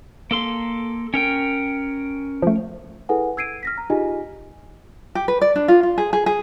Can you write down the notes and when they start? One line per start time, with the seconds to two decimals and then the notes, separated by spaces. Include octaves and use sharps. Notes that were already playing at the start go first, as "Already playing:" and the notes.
0.31 A#3 A4 C6
1.14 C#4 A#4 G5
2.42 F3 A3
3.09 E4 G#4 A4 B4 F#5 G#5
3.37 E6 G#6 C7 D7 D#7
3.63 F6 A#6 B6
3.78 A#5
3.90 D#4 F4 G4 G#4 D#5 G#5
5.15 G4
5.28 B4
5.42 D5
5.56 D4
5.68 F4
5.83 F4
5.98 G#4
6.13 G#4
6.26 G#4